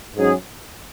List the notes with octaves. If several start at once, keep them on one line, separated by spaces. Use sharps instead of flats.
G#2 F#3 C#4 G#4